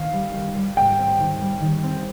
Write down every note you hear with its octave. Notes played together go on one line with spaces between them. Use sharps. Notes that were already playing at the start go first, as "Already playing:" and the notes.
Already playing: D#3 C4 F5
G3
D#3
G3
G#2 G5
C4
D#3
G3
D#3
C4